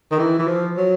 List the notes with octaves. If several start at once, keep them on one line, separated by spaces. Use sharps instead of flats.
D#3
E3
E3
F3
F#3